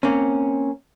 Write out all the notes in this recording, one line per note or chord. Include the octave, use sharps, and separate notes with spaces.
A#3 C4 C#4